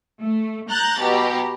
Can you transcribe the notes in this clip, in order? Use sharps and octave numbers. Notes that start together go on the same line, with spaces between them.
A3
A#5 F#6 G6 A6
B2 G4 A#5